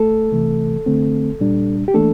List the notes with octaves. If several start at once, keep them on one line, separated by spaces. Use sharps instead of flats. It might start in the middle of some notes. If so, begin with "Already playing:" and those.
Already playing: A3 A4
C3 E3 A3
D3 A3 C4
A#2 G3 D4
G4
E3 A3 A#3 D4 A4